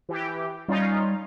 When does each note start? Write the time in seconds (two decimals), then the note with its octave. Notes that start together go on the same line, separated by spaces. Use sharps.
0.09 E3 G4
0.68 G3 C#4 D#4 F4